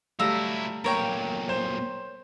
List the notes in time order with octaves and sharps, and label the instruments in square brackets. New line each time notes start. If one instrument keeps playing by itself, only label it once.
[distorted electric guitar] F#3 E4 [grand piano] G3 A3 F5 [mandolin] A#5 E6
[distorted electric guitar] B1 A#2 [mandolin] A#4 C#5 G5
[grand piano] C5